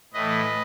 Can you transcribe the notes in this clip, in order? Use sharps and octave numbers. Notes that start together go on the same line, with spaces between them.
A2 E3 A3 B4 D#5